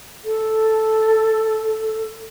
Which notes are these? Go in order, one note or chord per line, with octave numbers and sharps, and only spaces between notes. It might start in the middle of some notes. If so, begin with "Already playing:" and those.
A4